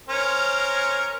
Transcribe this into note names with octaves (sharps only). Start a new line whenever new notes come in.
C#4 A#4 C5